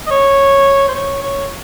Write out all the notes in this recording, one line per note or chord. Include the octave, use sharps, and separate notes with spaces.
D#5
C#5
C5
C#5
C#5